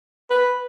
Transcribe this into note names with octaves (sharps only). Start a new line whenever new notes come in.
B4